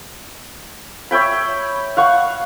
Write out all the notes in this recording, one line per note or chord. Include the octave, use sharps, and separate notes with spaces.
C#5 E5 G5 B5
F5 F#5 C#6